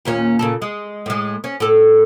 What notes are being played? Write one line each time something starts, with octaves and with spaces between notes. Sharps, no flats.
D#2 A#2 C#4
A#2 C#3 A4
G#3
A2 G#3
C#4
A2 A4